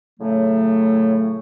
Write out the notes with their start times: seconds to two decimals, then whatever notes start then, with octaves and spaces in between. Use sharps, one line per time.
0.20 A2 C#3 F#3 A3